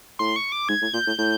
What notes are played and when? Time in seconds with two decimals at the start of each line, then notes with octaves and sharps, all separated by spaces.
0.19 A2 C6
0.36 C#6
0.52 D6
0.69 G#2 G#6
0.82 A2
0.93 A#2 G6
1.07 A2
1.18 A2 G6